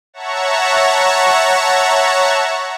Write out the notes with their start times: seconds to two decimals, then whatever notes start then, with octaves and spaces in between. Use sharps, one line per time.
0.13 C#5 E5 F#5 A5 A#5 C#6